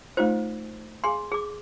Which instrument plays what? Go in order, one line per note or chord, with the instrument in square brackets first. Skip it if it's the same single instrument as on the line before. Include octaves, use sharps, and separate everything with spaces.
[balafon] A3 D#4 F4 [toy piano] C5
[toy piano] G#4 C6 [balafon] F5 G#5
[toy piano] G#4 D6